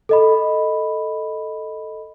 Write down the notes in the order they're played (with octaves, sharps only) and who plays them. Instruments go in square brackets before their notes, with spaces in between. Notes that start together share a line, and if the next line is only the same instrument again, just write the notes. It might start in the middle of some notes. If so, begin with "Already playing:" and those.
[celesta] A4 D#5 B5